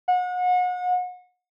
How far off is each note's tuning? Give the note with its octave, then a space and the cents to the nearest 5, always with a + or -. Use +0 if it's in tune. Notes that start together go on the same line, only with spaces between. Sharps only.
F#5 -35